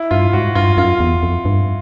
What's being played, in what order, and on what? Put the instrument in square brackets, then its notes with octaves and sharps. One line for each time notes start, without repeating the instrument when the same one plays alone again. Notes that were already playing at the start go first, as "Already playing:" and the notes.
Already playing: [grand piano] E4
[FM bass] G2 [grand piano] F4
[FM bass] G#2 [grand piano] F#4
[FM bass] G2 [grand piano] F4
[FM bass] F#2 [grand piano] F4
[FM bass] E2
F2
G2